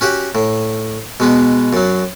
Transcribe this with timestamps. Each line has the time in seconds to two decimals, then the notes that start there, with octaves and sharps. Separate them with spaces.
0.01 C#4 F#4 G4 F#5
0.35 A2
1.20 B2 G#3 B3
1.73 F#2 F#3